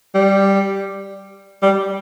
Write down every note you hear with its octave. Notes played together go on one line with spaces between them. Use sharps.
G3
G3